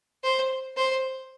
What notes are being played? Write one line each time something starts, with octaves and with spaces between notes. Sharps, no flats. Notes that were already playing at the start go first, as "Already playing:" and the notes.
C5
C5